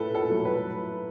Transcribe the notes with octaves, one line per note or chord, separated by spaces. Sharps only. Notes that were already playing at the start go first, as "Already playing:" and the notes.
Already playing: A2 A4 B4
A4
F#3 A3
B4